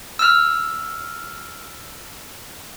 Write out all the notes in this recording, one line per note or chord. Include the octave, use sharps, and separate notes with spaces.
E6 F6